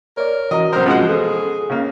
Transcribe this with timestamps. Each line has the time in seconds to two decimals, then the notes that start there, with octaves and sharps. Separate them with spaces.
0.17 A#4 C#5 D5
0.51 E3 F#4 D#5 A#5
0.73 B1 C4 A#4 C5
0.86 B2 F3 G#3 F#5
1.09 G#4 A4
1.69 C#3 A#3